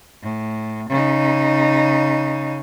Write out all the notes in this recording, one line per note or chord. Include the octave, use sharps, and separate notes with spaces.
A2
C#3 D#4